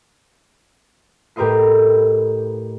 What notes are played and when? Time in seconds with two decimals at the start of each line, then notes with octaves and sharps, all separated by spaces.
1.36 A2 G4 A#4 B4 D#5 C7